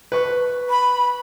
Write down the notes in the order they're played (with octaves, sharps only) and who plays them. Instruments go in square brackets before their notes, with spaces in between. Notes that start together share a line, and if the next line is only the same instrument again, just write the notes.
[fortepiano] B4 C#6
[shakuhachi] B5